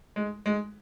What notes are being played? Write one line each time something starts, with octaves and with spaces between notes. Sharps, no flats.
G#3
G#3